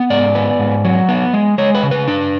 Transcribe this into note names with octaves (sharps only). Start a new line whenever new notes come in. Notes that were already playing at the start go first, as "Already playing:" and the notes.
Already playing: B3
G#2 D5
B3
G#2
F#3
B3
G#3
G#3 C#5
B4
C#3
B4
D4